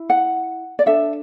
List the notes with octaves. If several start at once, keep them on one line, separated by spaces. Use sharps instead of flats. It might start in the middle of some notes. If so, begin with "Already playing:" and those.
Already playing: E4
F#5
D5
D4 A4 E5